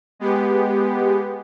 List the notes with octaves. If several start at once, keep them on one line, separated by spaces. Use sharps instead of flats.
G#3 B3 G4